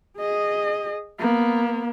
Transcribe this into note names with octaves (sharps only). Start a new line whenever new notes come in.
G#4 D#5
A#3 B3